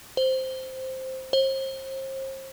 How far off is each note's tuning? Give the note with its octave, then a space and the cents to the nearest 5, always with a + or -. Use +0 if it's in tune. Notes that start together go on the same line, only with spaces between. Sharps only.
C5 +0
C5 +35